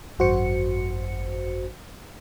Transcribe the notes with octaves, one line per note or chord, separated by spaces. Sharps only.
G#1 F#2 F#4 C5 C#7